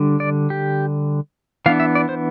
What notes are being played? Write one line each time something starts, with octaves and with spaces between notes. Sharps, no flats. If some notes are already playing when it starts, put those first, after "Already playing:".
Already playing: D3 G3 D4
D5
G4
E3 B3 D4 F5
E5
D5
C5